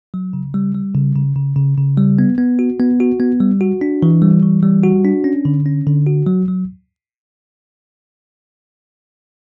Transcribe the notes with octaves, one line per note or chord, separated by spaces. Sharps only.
F#3
C#3
G3
G3
C#3
C#3
C#3
C#3
C#3
G3
B3
B3
F#4
B3
F#4
B3
G3
F#4
D4
E3
G3
E3
G3
F#4
D4
C#4
D3
C#4
D3
F#4
F#3
F#3